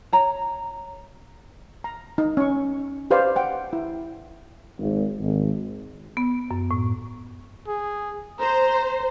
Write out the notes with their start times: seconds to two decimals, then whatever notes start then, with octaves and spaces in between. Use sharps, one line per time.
0.12 C#5 A#5
1.84 A#5
2.18 D#4
2.37 C#4 C#6
3.11 G4 B4 C5 D5 F5
3.36 F#5 G5
3.73 E4
4.79 G#1
5.19 G#1
6.17 B3
6.51 F#2
6.71 A2
7.68 G#4
8.40 C5 A#5